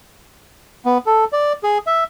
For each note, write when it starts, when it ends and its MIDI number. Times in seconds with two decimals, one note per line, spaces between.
0.85 0.98 59
1.06 1.25 69
1.32 1.53 74
1.63 1.78 68
1.87 2.04 76